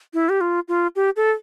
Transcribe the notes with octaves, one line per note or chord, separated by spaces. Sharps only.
E4
G4
F4
F4
G4
A4